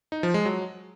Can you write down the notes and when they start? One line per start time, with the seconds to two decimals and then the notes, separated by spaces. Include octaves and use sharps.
0.12 D#4
0.23 F3
0.34 G#3
0.45 F#3